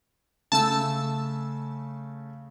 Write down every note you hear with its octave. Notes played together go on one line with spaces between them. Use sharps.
C#3 A3 A5 E6